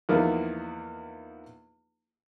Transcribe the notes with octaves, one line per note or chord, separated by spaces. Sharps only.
E2 F3 A#3 B3 D#4 F4